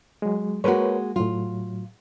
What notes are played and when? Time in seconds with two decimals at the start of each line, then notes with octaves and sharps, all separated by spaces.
0.22 F#3 G#3
0.64 G#3 A#3 F#4 A#4 B4 C#5
1.16 A2 F#3 F4